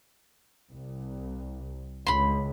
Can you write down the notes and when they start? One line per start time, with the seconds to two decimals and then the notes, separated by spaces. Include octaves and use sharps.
0.72 C2
2.06 C#2 B5 C6